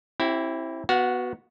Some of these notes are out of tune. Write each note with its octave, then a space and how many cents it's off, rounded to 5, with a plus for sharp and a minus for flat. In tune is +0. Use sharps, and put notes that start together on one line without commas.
C4 +30 E4 +0 G4 -30
B3 +0 F#4 +0 F5 +40